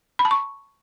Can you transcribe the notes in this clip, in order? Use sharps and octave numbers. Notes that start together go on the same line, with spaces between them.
B5
A5
C#6